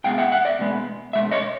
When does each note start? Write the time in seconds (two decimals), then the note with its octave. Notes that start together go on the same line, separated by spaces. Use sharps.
0.04 B2 G#3 B3 F5 G5
0.18 E5 F#5
0.32 E5 F#5
0.45 D5 E5
0.59 B2 G#3 B3
1.13 B2 G#3 E5
1.31 C#5 D#5